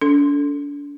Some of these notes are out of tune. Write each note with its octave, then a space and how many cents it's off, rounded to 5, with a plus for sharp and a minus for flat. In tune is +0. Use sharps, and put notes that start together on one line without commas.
D4 -35 A4 +0